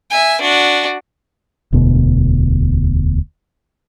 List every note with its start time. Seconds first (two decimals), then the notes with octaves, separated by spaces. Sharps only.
0.11 E5 G#5
0.41 D4 F#4
1.73 E1 D2 B2